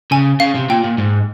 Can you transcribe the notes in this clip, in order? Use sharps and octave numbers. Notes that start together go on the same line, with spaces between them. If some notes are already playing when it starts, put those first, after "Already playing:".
C#3 G#5
C#3 F5
C3
A#2 G5
A#2
G#2